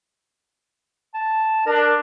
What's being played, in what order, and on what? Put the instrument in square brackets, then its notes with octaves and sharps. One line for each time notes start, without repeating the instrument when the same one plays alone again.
[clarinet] A5
[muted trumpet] D4 [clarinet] A#4